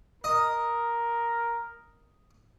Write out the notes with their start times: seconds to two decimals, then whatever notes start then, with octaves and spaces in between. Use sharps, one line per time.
0.24 A#4 D#5